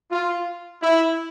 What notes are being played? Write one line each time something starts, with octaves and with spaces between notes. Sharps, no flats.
F4
E4